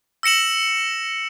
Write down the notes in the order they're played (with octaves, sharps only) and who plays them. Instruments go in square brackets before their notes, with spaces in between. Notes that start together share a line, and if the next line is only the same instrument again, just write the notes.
[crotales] E6 A#6 C#7 E7 F#7